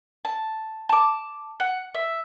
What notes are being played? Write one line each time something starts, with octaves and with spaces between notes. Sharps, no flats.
A5
A5 D6
F#5
E5